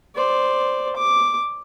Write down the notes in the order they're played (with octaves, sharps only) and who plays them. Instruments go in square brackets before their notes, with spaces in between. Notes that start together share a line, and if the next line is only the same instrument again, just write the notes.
[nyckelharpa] C5 D5
D6